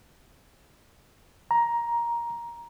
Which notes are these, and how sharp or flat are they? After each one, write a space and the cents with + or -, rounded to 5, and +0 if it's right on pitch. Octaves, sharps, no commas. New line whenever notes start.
A#5 +10